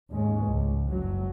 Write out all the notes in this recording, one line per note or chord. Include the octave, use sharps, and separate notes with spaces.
D#2 G#2 G#3 C#4
C#2
F#1 F#3